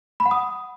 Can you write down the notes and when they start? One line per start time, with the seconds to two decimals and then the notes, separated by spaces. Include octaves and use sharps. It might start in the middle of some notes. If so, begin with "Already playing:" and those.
0.20 B5
0.26 F#5
0.31 D#6